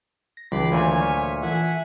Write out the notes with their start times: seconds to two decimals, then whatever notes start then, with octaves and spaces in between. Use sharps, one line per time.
0.37 A#6
0.52 C#2 D#3 E3 F#3 B5 C6 D6
0.72 D2 A#2 C#5 G#5
1.00 C#6 F6 B6
1.42 E3 F4 A4 E5 F#5 G#5